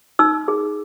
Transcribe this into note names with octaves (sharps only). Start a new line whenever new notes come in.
D#4 E6
G#4